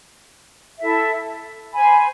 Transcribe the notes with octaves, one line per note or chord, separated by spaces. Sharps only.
E4 A4 E5
C5 G#5 B5